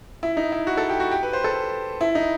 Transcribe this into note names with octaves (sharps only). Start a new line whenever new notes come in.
E4
D#4
E4
F#4
A4
G4
F#4
G4
B4
C5
A4
E4
D#4